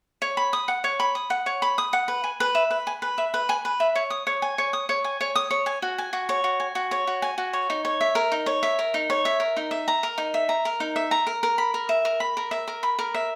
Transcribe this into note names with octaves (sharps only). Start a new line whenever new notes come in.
C#5
B5
D#6
F#5
C#5
B5
D#6
F#5
C#5
B5
D#6
F#5
B4
G#5
B4
E5
B4
G#5
B4
E5
B4
G#5
B4
E5
C#5
D#6
C#5
G#5
C#5
D#6
C#5
G#5
C#5
D#6
C#5
G#5
F#4
G#5
F#4
C#5
F#4
G#5
F#4
C#5
F#4
G#5
F#4
C#5
D#4
C#5
E5
A#4
D#4
C#5
E5
A#4
D#4
C#5
E5
A#4
D#4
E5
A#5
A#4
D#4
E5
A#5
A#4
D#4
E5
A#5
A#4
A#4
B5
A#4
E5
A#4
B5
A#4
E5
A#4
B5
A#4
E5